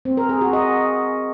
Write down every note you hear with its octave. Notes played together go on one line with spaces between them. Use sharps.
C4
A#4
G#4
F#4
D#5